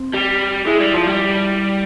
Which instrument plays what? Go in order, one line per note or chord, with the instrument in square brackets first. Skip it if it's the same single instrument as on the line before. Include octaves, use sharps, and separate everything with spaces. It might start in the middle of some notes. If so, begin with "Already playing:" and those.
Already playing: [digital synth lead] C4
[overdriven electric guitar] G3
[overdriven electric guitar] G#3 [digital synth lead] E4
[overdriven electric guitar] G3
F3
G3